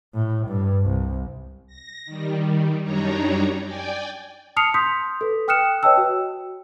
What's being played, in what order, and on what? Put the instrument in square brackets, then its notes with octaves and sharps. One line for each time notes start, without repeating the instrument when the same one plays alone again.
[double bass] A2
G2
C2
[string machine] A#6
D#3 G3
F#2 G3 D4 D#4 C#5 A#5
D5 G5 G#5
[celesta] A5 D#6 F6 C7 C#7 F7
C6 D#6 G6 B6
A4 B4
G5 D#6 F6 F#6 C#7 E7
B4 C#5 D#5 G5 A5 E6
F#4